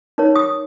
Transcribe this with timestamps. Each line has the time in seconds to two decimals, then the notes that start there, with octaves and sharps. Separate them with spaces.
0.18 D#4 A#4 C#5
0.36 D#6